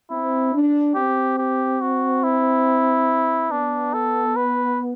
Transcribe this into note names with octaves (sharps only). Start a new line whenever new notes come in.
C4 E4
D4
C4 G4
G4
F#4
E4
B3 D4
A4
B4